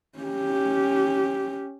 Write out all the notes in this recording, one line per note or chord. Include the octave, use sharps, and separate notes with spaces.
C#4 G4